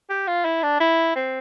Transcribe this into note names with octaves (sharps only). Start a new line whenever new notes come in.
G4
F4
E4
D4
E4
C4